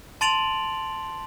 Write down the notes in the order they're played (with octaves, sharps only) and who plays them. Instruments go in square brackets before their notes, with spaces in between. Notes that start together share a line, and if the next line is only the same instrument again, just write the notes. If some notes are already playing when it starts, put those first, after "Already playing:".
[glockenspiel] A5 C6 A6 D7 F7 F#7